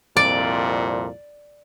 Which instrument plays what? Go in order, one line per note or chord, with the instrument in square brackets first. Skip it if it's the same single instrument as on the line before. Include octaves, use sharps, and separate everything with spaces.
[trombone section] C2 F2 A#2 [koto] D5